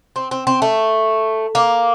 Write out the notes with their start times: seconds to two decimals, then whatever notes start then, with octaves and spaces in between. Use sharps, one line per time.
0.16 C4
0.31 C4
0.47 C4
0.62 A3
1.55 A#3